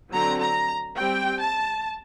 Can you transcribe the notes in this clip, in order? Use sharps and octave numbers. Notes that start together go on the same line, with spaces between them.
D3 F#3 C4 A#5
A#5
G3 C4 G5
A5